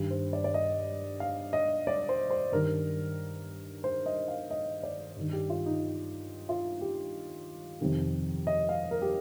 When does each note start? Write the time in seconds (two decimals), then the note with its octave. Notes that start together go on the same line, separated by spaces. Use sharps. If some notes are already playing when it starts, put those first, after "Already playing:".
Already playing: G2 D#3
0.11 C5
0.33 D5
0.44 D5
0.54 D#5
1.20 F5
1.53 D#5
1.87 D5
2.09 C5
2.31 C5
2.52 G2 D#3 A#4
3.84 C5
4.06 D#5
4.28 F5
4.51 D#5
4.83 D5
5.16 G2 D#3
5.32 G4
5.50 F4
5.66 D#4
6.49 F4
6.81 G4
7.81 F2 C3 D#3
8.47 D#5
8.69 F5
8.91 A#4
9.02 G4